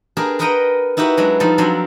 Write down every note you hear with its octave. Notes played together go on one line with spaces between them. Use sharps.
D4 G4 G#4 A#4 B4
A#4 B4 D#5 F#5 G5 A#5
D#4 E4 F#4 G4 B4
F#3 G#3 D4
F3 G3 D#4 F4 A4
F3 F#3 C4 D4 C6